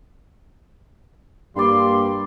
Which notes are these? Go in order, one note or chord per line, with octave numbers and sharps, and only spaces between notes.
G2 G3 A#3 D5 B5 C6